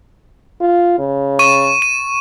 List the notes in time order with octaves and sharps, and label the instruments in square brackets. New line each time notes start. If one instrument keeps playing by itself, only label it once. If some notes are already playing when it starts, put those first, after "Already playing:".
[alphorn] F4
C#3
[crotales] C#6 D#7
D#7